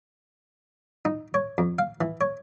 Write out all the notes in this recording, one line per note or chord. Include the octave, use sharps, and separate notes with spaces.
D#4
C#5
F2
F5
E3
C#5